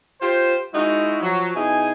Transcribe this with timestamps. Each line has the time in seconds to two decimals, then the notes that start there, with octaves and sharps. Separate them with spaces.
0.21 F4 G4 C5
0.73 G#3 D#4 E4 F#4
1.21 F3 F#3
1.55 B2 D#4 E4 G#4 G#5